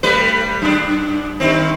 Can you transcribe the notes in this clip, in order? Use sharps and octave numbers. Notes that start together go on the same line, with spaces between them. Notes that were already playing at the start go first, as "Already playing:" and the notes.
G3 A3 B4
F#2 D4
G2 D#3 C4